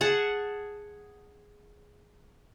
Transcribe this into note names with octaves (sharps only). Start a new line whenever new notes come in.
G#4 F#5 A5